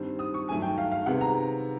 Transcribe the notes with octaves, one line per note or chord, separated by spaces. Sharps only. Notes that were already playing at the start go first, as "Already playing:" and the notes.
Already playing: G2 D#3 G3 C4
D#6
C#6
G2 D#3 F#3 A3 D4 G#5
G5
F5
F5
C3 D#3 G#3 B3 F#5
A#5